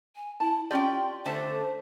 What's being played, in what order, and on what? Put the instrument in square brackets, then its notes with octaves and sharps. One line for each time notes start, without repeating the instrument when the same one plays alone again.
[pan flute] G#5
[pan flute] E4 [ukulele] A5
[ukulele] C#4 F4 G4 [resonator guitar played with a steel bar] D5 G5 [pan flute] C6
[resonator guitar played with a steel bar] D3 A3 A5 [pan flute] C5